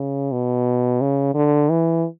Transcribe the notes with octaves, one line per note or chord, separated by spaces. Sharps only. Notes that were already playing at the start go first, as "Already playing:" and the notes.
Already playing: C#3
B2
C#3
D3
E3